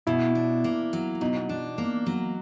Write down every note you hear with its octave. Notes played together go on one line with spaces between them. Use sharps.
B2 E4
D4
A#3
F#3
B2 D#4
D4
A#3
F#3